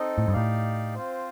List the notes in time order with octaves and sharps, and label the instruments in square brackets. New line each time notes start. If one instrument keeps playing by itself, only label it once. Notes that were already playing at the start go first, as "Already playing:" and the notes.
Already playing: [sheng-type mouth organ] C4 D#4 A4 D#5
[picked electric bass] A2
G2
[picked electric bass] A2 [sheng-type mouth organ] D#4 G4 D5 F5
[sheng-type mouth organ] C4 F4 C5